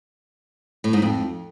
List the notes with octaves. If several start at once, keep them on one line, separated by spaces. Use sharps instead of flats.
A2
G#2
F2